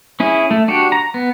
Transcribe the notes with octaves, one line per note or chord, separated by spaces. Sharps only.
C#4 E4 G#4
A3
D4 F#4 G4
A#5
B3